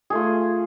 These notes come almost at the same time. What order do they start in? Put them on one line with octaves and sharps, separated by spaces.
G#4 A3 F4